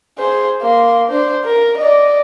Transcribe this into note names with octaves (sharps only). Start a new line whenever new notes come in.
G#4 C5
A#3 C6
D4 C5
A#4
D5 D#5